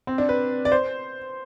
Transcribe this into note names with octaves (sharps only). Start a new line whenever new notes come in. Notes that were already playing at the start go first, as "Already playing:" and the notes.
C4
D4
B4
D5
C5